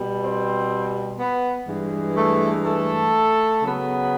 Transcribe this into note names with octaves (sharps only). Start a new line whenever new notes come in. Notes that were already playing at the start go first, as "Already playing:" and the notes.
Already playing: B2 G3
C4 C5
B3 B4
G2 E3 G#3
A3 A4
A3 A4
C#3 F#3 B3